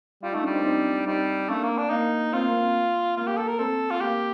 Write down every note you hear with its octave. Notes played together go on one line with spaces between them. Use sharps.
G3 F4
A3 D#4
G3 D4
C4 D#4
C4 D#4
G3 C4 D#4
A3 A#3 D4
A#3
D4
A#3 D#4
C4 F4
A#3
C4
A#3 F4
G4
A4
A#4
C4 A4
F4
A#3 G4